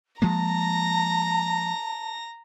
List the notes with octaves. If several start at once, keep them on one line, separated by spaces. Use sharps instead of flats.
F3 G#3 A#3 A5 A#5 A#6